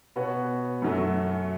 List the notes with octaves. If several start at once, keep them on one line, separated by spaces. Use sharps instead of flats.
B2 B3 F#4 C#5
F#2 F#3 A3